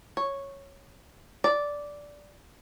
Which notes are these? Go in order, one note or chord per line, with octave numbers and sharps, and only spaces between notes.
C#5
D5